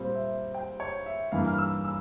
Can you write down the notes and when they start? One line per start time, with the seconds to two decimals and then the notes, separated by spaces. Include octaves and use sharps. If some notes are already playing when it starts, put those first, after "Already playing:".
Already playing: A#2 G3 C4 C5
0.15 E5
0.54 G5
0.80 C#5
1.06 E5
1.32 G2 E3 A#3 F5
1.48 F6
1.58 E6
1.84 E6